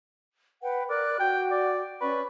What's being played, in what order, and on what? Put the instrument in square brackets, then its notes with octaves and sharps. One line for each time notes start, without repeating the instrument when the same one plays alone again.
[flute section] B4 F#5 G5
[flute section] A#4 F#6 [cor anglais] D5
[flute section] F#4 [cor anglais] G5
[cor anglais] D5
[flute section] C#4 D5 C#6 [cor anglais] B4